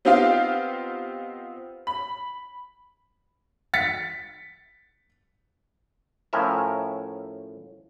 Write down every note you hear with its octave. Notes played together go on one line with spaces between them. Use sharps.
B3 C4 D#4 F4 G4 F5
B5
A6 B6 C#7
A2 F3 C#4 A#4 E5